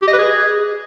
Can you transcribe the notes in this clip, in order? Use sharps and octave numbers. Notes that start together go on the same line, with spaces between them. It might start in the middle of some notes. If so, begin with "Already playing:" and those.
G4
D#5
B4
G#4